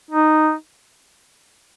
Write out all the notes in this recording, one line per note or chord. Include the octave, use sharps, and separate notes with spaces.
D#4